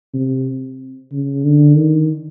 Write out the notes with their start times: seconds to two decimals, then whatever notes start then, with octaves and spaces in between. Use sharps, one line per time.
0.14 C3
1.12 C#3
1.44 D3
1.77 D#3